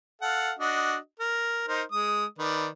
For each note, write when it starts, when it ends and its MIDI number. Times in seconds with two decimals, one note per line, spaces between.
0.22 0.52 69
0.22 0.52 77
0.22 0.52 78
0.59 0.96 62
0.59 0.96 66
0.59 0.96 75
1.20 1.68 70
1.68 1.83 63
1.68 1.83 70
1.68 1.83 72
1.92 2.25 56
1.92 2.25 87
2.39 2.68 51
2.39 2.68 71
2.39 2.68 74